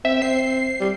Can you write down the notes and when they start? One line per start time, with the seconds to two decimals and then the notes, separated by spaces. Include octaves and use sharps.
0.05 C4 E5
0.22 C4 C7
0.80 G3